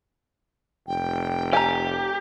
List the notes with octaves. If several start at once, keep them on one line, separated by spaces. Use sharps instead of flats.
F1 G5
G4 G#5 A#5